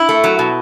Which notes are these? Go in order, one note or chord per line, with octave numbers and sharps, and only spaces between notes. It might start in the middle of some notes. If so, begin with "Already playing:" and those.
Already playing: E4
A3
F#3
B2